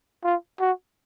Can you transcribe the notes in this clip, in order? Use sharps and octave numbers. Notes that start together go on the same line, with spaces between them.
F4
F#4